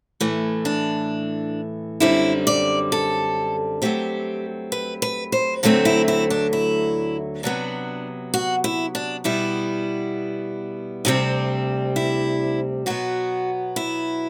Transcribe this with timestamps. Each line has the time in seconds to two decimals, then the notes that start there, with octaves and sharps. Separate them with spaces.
0.20 A2 E3 A3
0.65 D4
2.00 F#2 D3 G3 C4 E4
2.47 D5
2.92 A4
3.82 G2 F#3 A3 C4 G4
4.72 B4
5.02 B4
5.32 C5
5.63 D2 D3 F#3 A3 C4
5.85 E4
6.08 E4
6.30 D4
6.53 E4
7.43 C3 F#3 B3 D4
8.34 F#4
8.64 E4
8.95 D4
9.24 B2 G3 B3 E4
11.05 D2 C3 G3 C4
11.96 E4
12.86 B2 F#3 B3 F#4
13.76 E4